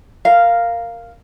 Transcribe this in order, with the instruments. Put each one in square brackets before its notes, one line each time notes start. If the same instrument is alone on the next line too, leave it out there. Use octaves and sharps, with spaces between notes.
[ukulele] A#4 F5